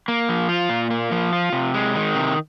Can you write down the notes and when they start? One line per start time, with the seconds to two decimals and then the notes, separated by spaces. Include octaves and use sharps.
0.08 A#3
0.29 F3
0.49 F4
0.69 A#2
0.91 A#3
1.12 F3
1.33 F4
1.53 C3
1.74 G#3
1.95 D#3
2.15 C3